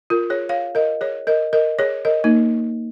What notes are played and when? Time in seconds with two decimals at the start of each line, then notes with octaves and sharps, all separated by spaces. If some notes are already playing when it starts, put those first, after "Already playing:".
0.10 F4 A#4
0.30 G#4 C#5
0.49 C#5 F5
0.75 A#4 D#5
1.01 G#4 C#5
1.27 A#4 D#5
1.53 A#4 D#5
1.79 G#4 C#5
2.05 A#4 D#5
2.24 A#3 D#4